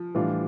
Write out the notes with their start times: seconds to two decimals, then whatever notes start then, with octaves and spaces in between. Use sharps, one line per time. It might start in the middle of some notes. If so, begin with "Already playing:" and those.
Already playing: F3
0.15 A2 E3 G3 D4 F4